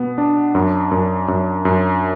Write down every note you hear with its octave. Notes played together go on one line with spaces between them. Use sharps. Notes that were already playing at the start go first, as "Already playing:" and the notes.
Already playing: B2 B3
D4
F#2
F#2
F#2
F#2